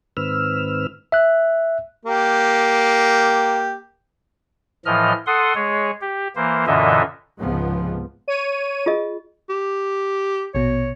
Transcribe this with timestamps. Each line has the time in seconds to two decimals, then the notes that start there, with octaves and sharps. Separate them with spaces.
0.17 G#2 D#3 C4 B4 E6 F6
1.12 E5 F#6
2.05 A#3 G4
4.85 A2 E3 F3 D#5 F6
5.27 A4 F#5 C6 D#6
5.55 G#3 G#4 C#5
6.01 G4
6.36 E3 A#3 C5
6.67 F#2 A#2 D3 E3 D#5 E5
7.39 C#2 G#2 C3 F3 B3
8.28 C#5 D#7
8.86 F4 G#4 D#5
9.50 G4
10.55 A#1 B2 C#5